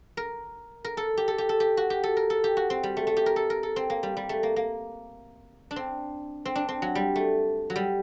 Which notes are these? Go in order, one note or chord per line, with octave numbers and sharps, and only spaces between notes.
A#4
A#4
A4
G4
A4
G4
A4
G4
F#4
G4
A4
A#4
A4
G4
F#4
C4
G3
A3
A3
G4
A#4
A4
A#4
A4
C4
A#3
G3
G3
A3
A#3
A#3
D4
C4
C4
D4
C4
F#3
G3
A3
F#3
G3